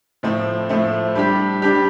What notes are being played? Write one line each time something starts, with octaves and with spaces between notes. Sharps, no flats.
A2 F3 A3 C4
A2 F3 A3 C4
G3 D4 G4
G3 D4 G4